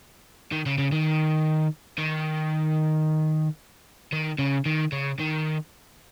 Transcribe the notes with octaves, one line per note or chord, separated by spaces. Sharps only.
D#3
C#3
C#3
D#3
D#3
D#3
C#3
D#3
C#3
D#3